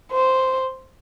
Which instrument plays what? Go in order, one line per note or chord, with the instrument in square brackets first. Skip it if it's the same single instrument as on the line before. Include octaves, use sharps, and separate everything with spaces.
[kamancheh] C5